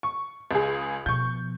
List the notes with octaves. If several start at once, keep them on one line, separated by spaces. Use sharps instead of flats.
C#6
C#2 G#4
B2 F3 C#6 G6